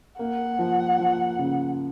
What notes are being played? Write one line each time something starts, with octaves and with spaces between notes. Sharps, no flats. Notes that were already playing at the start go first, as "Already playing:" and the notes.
A#3 F#5
F3
F3
C#3